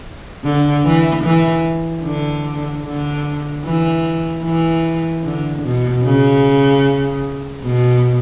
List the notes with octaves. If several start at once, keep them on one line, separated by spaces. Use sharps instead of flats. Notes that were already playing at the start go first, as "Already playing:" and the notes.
D3
E3
E3
D3
D3
E3
E3
D3
B2
C#3
B2